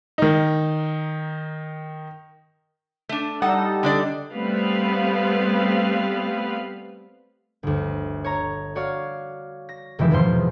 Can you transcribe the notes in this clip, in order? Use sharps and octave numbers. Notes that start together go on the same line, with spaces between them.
D#3 D#4
A3 D4
G3 D#4 A4 F#5
D3 D4 D5
G3 A3 B3 C4 B4 F5
G1 D2
C#5 A#5
F#4 C#5 D5 F5
A#6
F1 D#3 E3 G#3 G4 E5
E2 G#2 B2 F3 C5 C6